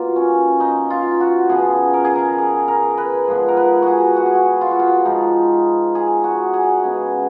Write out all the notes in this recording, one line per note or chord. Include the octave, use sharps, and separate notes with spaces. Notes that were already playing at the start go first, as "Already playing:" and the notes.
Already playing: B2 A#3 F4
C#4
D#4
F4
F#4
C#3 F3 B3 G#4
A#4
G#4
A#4
G#4
A#4
B4
G#2 F3 B3
A#4
B4
F#4 G#4
F#4
G#4
F#4
F4
F#4
F4
G#2 F3 G#3 D#4
G#4
F#4
G#4
C#3 G#3 B3